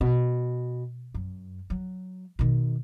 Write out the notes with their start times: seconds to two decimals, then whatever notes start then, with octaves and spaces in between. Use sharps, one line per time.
0.01 B2
1.14 F#2
1.70 F#3
2.39 B2 D#3